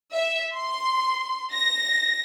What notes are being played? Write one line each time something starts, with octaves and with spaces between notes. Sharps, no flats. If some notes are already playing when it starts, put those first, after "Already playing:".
E5
C6
A#6